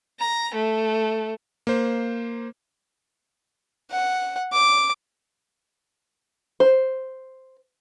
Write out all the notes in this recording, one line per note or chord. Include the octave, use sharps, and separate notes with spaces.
A#5
A3
A#3 C5
F#5
D6
C5